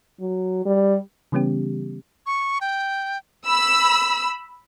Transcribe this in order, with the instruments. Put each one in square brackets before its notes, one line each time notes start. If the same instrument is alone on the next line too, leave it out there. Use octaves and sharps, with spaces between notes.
[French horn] F#3
G3
[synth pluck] C#3 E3 G3 B3 C#4 G4
[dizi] C#6
G5
[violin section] B5 E6